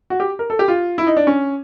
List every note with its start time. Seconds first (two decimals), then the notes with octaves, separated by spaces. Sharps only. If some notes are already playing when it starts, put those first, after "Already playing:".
0.10 F#4
0.20 G4
0.39 A#4
0.50 A4
0.59 G4
0.68 F4
0.98 E4
1.07 D#4
1.17 D4
1.27 C#4